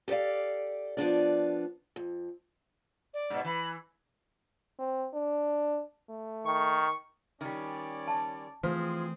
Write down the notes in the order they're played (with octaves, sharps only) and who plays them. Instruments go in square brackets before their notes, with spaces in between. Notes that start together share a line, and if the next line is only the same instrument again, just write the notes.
[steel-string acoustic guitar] G4 A4 C5 D5 F5
F3 B3 D4 D5
F2
[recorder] D5
[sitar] G#2 B2
[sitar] E3 [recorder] B5
[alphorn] C4
D4
A3
[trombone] D#3 [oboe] C#6
[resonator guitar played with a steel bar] D#3 G3 [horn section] C#4 D5
[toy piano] A5
[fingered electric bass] E3 A3 [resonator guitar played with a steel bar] F3 [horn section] C4 G#4 [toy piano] C5